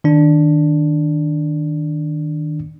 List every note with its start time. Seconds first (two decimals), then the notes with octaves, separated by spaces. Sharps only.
0.04 D#3 D4